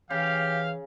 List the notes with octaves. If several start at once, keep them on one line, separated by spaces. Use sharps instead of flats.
C#3 E3 G4 F5